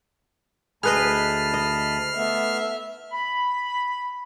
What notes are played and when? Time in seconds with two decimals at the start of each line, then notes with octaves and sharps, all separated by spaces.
0.83 D2 G#4 B4 D#5 A5 B5 F6 C7
1.54 D#5
2.16 A3 B3 E5
3.12 B5